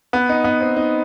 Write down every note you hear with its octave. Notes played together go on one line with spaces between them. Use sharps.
B3
D#4
B3
C4
D#4